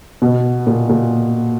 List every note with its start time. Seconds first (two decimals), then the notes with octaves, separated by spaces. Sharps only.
0.22 B2
0.67 A#2
0.89 A#2